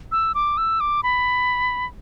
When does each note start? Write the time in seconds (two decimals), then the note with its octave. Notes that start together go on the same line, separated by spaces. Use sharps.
0.12 E6
0.35 D6
0.58 E6
0.80 D6
1.03 B5